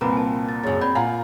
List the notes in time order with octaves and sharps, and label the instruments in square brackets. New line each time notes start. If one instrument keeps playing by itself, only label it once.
[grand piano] C2 A#2 [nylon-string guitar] C4 [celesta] B4 A#5 B5
[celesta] G#5 A5
A6
[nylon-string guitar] F#2 C#3 [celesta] A6
[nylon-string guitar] C4 [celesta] D5 B5 G6
[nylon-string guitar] A#2 [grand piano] F5 G#5 A#5 [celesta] F#5